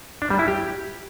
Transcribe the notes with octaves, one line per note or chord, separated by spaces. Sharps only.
D4
G3
E4
G4